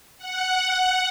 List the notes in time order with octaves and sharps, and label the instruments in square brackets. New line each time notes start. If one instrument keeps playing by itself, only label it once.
[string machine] F#5